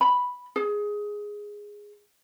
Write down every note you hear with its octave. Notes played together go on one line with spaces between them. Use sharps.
B5
G#4